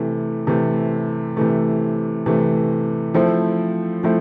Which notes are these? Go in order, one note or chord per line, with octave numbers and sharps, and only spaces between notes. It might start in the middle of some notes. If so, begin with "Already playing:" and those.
Already playing: C3 E3 A3
C3 E3 A3
C3 E3 A3
C3 E3 A3
F3 A3 C4 E4 A4
F3 A3 C4 E4